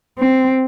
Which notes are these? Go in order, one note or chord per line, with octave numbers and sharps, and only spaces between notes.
C4